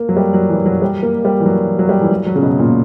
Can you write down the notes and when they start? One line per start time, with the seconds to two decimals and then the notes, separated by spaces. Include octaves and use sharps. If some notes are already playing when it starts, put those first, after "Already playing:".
Already playing: A#3
0.09 F#3
0.17 G3
0.34 F#3
0.49 E3
0.66 F#3
0.82 G3
1.03 A#3
1.25 G3
1.40 E3
1.46 F#3
1.79 F#3
1.89 G3
2.01 E3
2.11 F#3
2.26 F#3
2.36 C#3
2.43 B2
2.59 A#2